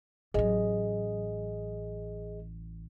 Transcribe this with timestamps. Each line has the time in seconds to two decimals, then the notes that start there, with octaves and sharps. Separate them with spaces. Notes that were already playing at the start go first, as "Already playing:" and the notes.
0.34 A1 F#3 G#4 D#5